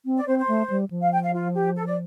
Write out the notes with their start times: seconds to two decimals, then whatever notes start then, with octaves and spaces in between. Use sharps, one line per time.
0.06 C4
0.17 D5
0.27 C4 C5
0.38 C5
0.48 A3
0.70 G3
0.91 F3
1.01 F5
1.12 G5
1.23 F5
1.33 F4
1.54 G4
1.76 A4
1.86 D5